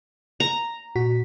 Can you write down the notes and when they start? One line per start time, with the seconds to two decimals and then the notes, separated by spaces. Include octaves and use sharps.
0.40 A#5
0.96 A#2 F#4 B6